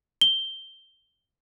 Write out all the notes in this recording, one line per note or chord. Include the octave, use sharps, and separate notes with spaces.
G7